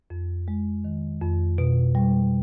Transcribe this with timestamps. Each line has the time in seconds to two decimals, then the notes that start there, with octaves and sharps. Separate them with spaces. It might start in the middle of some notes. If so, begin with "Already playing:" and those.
0.10 F2
0.48 G#3
0.84 D#3
1.22 F2
1.58 B2
1.95 G3